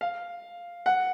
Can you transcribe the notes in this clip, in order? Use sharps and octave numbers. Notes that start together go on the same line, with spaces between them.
F5
F#5